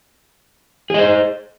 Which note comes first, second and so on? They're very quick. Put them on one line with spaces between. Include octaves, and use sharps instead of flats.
G#4 D#5 C5